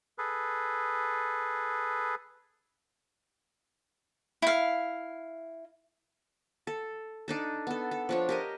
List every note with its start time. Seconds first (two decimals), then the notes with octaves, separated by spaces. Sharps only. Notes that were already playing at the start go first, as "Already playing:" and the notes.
0.18 G#4 A4 B4
4.42 E4 F5
6.67 A4
7.28 D4 D#4 A4
7.67 B3 A4
7.91 A4
8.09 F3 D4 C#5
8.29 G4 A#4 D#5